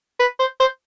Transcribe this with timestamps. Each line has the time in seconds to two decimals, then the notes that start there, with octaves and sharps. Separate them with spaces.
0.20 B4
0.39 C5
0.60 C5